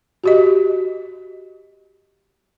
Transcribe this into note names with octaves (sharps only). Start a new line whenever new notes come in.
F#4 G4 D#5